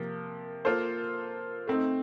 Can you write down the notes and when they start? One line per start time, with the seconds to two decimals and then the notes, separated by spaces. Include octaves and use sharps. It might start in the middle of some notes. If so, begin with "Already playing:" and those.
Already playing: C3 F3 A#3
0.65 A#3 F4 A4 C5
1.67 A3 C4 D#4